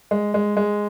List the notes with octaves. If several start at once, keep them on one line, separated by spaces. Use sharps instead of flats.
G#3
G#3
G#3